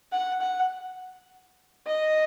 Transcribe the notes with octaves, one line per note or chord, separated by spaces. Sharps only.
F#5
F#5
D#5